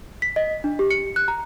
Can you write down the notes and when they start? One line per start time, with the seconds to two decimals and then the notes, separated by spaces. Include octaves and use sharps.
0.22 B6
0.36 D#5
0.64 D4
0.79 G4
0.91 C#7
1.16 F#6
1.28 A#5